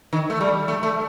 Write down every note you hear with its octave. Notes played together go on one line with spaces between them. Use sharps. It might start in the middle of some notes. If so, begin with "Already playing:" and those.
D#3
A3
G3
A3
A3